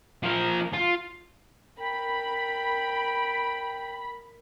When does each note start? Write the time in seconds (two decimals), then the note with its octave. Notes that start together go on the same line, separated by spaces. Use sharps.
0.23 F3 A#4
0.73 F4
1.80 A#4 G5 B5